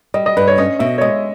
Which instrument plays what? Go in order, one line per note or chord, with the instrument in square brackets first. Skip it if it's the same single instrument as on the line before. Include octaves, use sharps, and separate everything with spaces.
[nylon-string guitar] G3 [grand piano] D#5
[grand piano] D#5
[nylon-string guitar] G2 [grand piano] B4
[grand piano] C#5
[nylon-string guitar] C#4 [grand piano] D#5
[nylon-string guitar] B2 [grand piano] E5
[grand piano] C#5
[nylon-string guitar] G#3 [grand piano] D#5